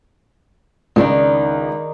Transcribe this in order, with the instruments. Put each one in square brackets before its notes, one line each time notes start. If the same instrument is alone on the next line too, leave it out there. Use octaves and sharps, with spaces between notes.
[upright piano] C#2 [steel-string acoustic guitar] D#3 D4 D#4